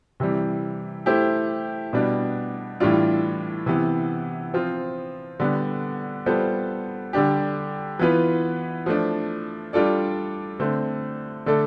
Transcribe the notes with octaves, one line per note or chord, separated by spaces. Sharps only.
C3 E3 G3
A3 E4 G4 C5
B2 G3 B3 D4
A2 E3 G3 D4 F4
C3 E3 B3
F3 C4 F4
D3 G3 B3
G3 B3 F4 A4 C5
D3 G3 D4 G4
E3 B3 F4 B4
F3 A3 D4
G3 D4 F4 A4 D5
D3 A3 C4
D3 A3 D4 A4